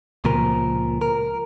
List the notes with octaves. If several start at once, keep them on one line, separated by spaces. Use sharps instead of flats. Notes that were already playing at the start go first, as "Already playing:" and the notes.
C#2 A#2 F3 A#4
A#4